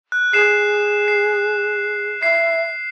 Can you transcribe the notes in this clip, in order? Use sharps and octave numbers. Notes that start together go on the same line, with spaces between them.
F#6
G#4 C7 E7
C7
E5 C7